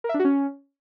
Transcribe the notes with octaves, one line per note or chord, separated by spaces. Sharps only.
A#4
E5
D4
F#4
C#4